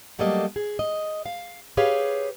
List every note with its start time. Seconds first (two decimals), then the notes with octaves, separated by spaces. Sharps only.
0.19 F#3 G3 A3 A#3 A4 D#5
0.56 G#4
0.79 D#5
1.26 F5
1.77 G4 G#4 B4 C#5 F5